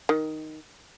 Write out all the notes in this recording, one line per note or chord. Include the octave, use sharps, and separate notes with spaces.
D#3